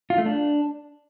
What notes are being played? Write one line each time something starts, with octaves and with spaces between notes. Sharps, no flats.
F4
A3
D4